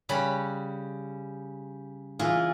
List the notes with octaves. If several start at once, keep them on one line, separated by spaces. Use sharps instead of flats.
C#3 G3 C#4 B4 C#5 B5
A#2 E3 F4 G#4 F5